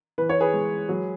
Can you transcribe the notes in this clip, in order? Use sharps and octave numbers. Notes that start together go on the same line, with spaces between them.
E3 B4
C#5
G#4 B4
G#3
F#3